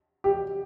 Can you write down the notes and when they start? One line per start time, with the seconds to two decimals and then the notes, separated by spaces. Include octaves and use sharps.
0.24 G4